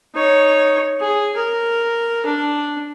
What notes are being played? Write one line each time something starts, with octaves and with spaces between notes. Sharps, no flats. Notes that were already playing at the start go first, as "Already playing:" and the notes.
D#4 C#5
G#4
A#4
D4